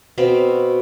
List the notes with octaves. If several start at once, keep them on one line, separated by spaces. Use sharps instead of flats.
B2 C4 F5 B5